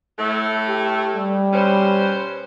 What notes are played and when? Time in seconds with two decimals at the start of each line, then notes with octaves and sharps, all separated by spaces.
0.19 A2 A3
0.68 G4
1.16 G3
1.54 B2 C#4 C5